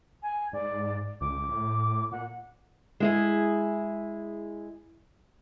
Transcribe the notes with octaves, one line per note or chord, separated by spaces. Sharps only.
G#5
G#2 D5
C#2 D6
A2
A#2 F#5
G#3 E4 G#4